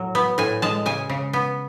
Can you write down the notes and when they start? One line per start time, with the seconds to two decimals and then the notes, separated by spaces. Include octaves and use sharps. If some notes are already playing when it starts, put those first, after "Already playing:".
Already playing: A2 F#3
0.15 B3
0.38 A2 G#5
0.62 G#3 A5
0.86 C#3 G#5
1.10 C#3
1.33 B3